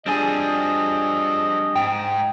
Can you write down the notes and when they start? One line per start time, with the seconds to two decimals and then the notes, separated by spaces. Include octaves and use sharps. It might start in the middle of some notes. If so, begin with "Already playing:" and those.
0.06 F3 G3 C4 D4 G#4 D#5
1.76 G#2 G5